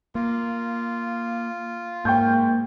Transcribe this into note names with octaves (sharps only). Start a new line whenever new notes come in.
A#3 F4
G#2 A#3 G5 C#6 G6